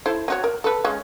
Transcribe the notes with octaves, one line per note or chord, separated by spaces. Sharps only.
E4 A4 C5
C4 F#4 C#5
A#4
A4 B4
G#3 C#4